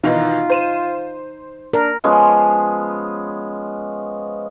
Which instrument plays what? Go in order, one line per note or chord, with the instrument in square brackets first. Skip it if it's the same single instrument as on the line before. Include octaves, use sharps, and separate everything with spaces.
[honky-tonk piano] B2 D#3 E3 [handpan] D#4 [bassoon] F4
[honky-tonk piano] C5 D#7 E7
[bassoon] D4 [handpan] A#4
[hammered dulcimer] F3 G#3 B3 C#4